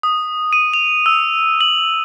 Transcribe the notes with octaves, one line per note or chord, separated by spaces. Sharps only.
D#6
D#7
F7
E6
F#7